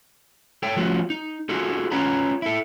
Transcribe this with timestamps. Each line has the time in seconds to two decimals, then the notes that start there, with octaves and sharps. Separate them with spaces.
0.63 A4 C#5 G5
0.76 F3 A3 B3 C#4 F4 F#4
1.10 D#4
1.49 D#4 F4 F#4 G#4 A4
1.91 C#4 F4 B4 C#5 A#5 B5
2.42 E4 A4